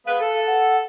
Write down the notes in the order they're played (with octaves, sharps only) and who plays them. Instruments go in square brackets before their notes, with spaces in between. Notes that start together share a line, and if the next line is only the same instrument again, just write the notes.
[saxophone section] G#3 B3 B4 [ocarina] F5
[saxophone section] A4
[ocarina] F#5